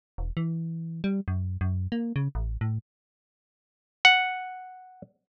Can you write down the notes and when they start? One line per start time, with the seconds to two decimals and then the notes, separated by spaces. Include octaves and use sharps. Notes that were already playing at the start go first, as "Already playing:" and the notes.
0.18 E1
0.37 E3
1.04 G3
1.28 F#2
1.61 F#2
1.92 A#3
2.16 C#3
2.35 A1
2.61 A2
4.05 F#5